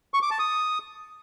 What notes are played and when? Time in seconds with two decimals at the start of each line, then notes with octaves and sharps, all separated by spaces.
0.14 C#6
0.22 D6
0.31 A5
0.39 D#6